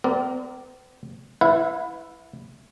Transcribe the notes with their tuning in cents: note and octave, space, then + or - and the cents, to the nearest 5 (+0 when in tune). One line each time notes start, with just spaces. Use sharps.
C4 -45 A#4 +0 D5 +0
E4 +0 B4 +20 F#5 -45